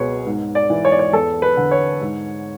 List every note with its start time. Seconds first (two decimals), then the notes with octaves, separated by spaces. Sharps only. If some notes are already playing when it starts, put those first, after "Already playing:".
Already playing: C#2 B2 G#4 B4 C#5
0.26 G#2
0.55 D5
0.70 E3
0.85 C#5
0.92 D5
0.99 C#5
1.13 E2 A4
1.42 B4
1.57 D3
1.71 C#5
2.01 G#2